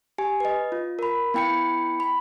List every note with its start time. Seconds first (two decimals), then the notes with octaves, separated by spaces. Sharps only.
0.18 G4 G#5
0.40 B4 D#5
0.72 F4
0.99 A#4 B5
1.34 B3 E4 G5 B5 C#7
2.00 B5